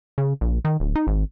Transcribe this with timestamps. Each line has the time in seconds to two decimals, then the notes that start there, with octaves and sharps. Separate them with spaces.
0.18 C#3
0.41 A#1
0.65 D#3
0.80 D1
0.96 D#4
1.07 G#1